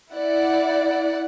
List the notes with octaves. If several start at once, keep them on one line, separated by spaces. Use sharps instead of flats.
E4 D5 F#5